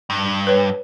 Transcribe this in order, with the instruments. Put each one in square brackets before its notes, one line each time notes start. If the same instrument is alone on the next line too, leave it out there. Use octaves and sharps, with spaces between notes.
[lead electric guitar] G2
[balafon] B4 C#5